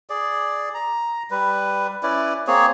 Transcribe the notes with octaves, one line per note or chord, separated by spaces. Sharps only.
G#4 D5
A#5
G3 B4
C#4 E4 B4 D5
A#3 C4 G#4 C#5